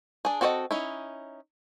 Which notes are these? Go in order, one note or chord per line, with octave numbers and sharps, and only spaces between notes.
D4 G#4
C4 F#4 A4 C#5 D#5
C#4 D#4 E4